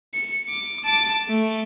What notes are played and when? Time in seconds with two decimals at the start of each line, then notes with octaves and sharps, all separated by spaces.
0.14 C#7
0.49 D6
0.85 A5 D6
1.28 A3